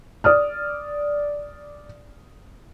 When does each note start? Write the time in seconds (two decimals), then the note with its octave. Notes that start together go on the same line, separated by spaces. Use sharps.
0.24 D5 D#6 F6